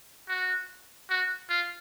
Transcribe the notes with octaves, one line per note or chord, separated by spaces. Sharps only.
F#4
F#4
F4